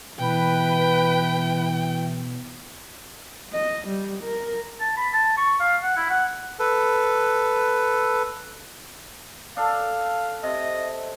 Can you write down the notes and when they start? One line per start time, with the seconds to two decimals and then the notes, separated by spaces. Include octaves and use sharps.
0.19 B2 E3 B4 G5
3.53 D#5
3.88 G3
4.24 A#4
4.80 A5
4.97 B5
5.13 A5
5.38 C#6
5.60 F5
5.83 F#5
5.97 E4
6.10 F#5
6.59 A4 B4
9.57 D4 A4 F5
10.43 C3 D#5